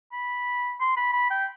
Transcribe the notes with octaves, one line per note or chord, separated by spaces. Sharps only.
B5
C6
B5
B5
G5